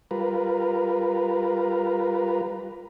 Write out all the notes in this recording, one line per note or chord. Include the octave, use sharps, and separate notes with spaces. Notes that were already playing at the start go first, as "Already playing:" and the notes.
G3 F4 A#4 B4